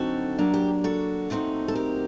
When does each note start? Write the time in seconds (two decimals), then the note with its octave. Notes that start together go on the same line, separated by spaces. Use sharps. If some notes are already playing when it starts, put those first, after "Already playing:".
Already playing: D3 F#3 C4 D#4 F#4 A4
0.38 F#3 A#3 D4
0.54 G4
0.84 F#4 A4
1.30 A#2 F#3 A3 C4 D#4
1.68 A4
1.75 G4 A#4